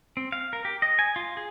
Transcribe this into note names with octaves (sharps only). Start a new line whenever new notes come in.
C4
F5
A#4
G4
D#5
G#5
F4
G#4